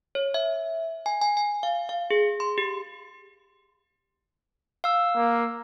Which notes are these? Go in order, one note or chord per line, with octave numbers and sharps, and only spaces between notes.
C#5
E5
G#5
G#5
G#5
F5
F5
G#4
C6
G4
F5 E6
A#3